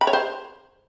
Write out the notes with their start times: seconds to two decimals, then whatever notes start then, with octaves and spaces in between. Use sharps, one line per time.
0.01 B5
0.07 C#5
0.13 C5